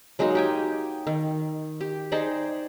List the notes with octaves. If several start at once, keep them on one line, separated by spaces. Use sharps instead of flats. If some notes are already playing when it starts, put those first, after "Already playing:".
F#3 G#3 A#3 D#4
G4 G5 G#5
D#3
G4
D#4 G#4 C5 D5